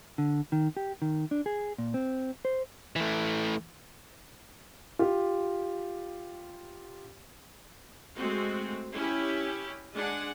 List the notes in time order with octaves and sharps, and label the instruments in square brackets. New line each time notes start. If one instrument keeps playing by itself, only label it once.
[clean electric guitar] D3
D#3
G4
D#3
D4
G#4
A#2
C4
C5
[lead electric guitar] E3 A3
[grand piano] F4 G4
[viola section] G#3 A3 C4 F#4
C#4 E4 G4
G#3 D4 F#5 G#5